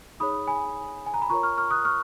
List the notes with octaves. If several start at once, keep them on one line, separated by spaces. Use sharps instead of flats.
D#4 G#4 C#5 B5 D#6
G#5 B5
G#5
A#5
B5
F4 A#4 C#5 A#5 C#6
C#6 F6
C#6 F6
D#6 F#6
C#6 F6